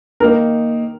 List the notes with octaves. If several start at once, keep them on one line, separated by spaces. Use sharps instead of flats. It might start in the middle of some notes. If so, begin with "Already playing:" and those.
D#3 A#3 D#4 A#4